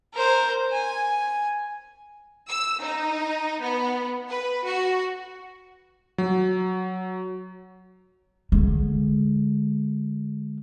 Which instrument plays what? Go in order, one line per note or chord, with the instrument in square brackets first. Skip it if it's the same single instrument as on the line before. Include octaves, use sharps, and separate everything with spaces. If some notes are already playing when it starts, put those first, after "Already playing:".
[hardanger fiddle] A#4 C5
G#5
[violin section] E6
D#4
B3
B4
F#4
[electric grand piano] F#3
[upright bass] D3 G#3